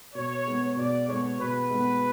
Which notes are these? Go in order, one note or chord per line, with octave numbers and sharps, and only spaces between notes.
B2 C#5
G#3 B3
B2 D5
G#3 B3 C#5
B2 B4
G#3 B3